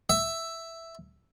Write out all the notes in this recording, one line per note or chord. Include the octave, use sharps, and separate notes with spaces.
E5